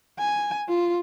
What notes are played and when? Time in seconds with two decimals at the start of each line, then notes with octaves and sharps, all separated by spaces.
0.19 G#5
0.69 F4